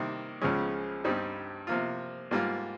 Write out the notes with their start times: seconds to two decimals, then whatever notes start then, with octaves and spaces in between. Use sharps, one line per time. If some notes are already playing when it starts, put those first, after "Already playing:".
Already playing: C3 D#3 G3 A#3
0.42 C#2 C#3 F3 G#3 C#4
1.04 G2 G3 C4 D#4
1.67 C3 F3 A#3 F4
2.31 G#2 G3 A#3 F4